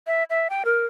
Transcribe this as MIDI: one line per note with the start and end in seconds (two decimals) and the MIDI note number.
0.07 0.24 76
0.30 0.48 76
0.50 0.63 79
0.65 0.86 70